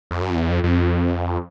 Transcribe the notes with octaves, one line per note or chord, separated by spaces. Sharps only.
F2
F#2
F2
E2
F2
F2